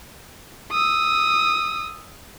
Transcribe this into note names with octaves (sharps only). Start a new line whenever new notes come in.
D#6 E6